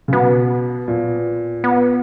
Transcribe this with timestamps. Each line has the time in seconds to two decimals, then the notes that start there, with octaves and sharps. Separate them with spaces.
0.08 C#3
0.13 B2 B3
0.88 A#2
1.64 B3